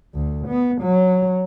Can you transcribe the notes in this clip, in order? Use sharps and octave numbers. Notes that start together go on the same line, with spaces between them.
D2
B3
F#3